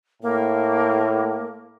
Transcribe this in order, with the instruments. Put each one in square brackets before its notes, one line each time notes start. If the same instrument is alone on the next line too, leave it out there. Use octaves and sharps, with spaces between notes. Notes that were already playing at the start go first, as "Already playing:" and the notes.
[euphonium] A2 [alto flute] A#3